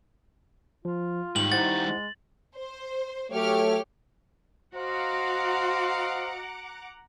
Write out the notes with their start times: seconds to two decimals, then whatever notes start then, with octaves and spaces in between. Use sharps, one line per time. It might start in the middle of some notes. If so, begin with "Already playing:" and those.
0.85 F3 F4
1.36 G#2 D#3 G3 F#7
1.52 D#4 E4 C5 F#5 A6
1.87 G#3
2.56 C5
3.32 F#3 A3 G4 C#5 F6
4.76 F#4 C5 D#5 F5 F#5 A#5 D6